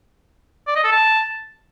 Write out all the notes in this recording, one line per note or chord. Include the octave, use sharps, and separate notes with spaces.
D5
D#5
A4
A5